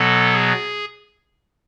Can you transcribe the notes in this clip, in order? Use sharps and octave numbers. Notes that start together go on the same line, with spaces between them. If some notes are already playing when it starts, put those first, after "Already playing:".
Already playing: B2 F#3 B3 A4
G#4